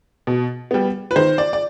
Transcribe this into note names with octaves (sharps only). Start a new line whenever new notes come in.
B2
G3 B3
B4
D#3 C5
D5
D5